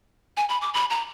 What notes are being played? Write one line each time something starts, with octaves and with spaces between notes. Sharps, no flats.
G#5
B5
D6
B5
A#5